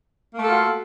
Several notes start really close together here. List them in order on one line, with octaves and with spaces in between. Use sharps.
A#3 A3 A4 F4 F#4